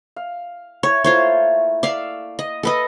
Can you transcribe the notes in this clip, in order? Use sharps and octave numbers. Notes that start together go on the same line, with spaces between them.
F5
E4 C#5
A3 A#3 E4 F4 C5 C#5
D5 E5 F5
D#5
A4 B4 D#5